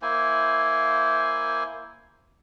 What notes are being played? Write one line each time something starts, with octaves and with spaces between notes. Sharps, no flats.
A#3 E4 C5 G#5